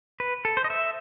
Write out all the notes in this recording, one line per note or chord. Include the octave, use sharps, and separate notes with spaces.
B4
A4
C5
D#5
E5